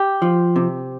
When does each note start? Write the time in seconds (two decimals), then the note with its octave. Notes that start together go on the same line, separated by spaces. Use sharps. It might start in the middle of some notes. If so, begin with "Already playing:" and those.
Already playing: G4
0.22 F3
0.56 C3